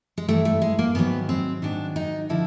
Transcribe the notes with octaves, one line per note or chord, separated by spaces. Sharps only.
G#3
G2 E3 A3
A3
G#3
A#3
G#2 D#3 F#3 B3
C4
G#2 D#3 F#3 D4
D#4
D3 F3 E4